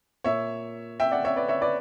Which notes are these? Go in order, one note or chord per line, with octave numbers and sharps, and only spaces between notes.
A#2 C#5 E5
E5 G5
D5 F#5
C#5 E5
B4 D5
C#5 E5
B4 D5